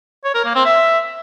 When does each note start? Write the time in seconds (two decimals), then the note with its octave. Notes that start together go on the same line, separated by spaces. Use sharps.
0.24 C#5
0.35 A#4
0.45 A#3
0.55 C4
0.65 E5